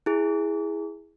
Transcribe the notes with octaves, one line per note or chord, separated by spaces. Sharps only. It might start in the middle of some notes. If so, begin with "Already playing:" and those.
E4 G#4